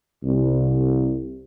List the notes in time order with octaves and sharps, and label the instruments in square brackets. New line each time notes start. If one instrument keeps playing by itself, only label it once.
[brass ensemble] C2